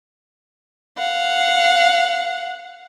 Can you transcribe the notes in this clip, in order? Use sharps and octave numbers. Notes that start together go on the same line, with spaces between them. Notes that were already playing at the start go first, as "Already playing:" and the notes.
F5 F#5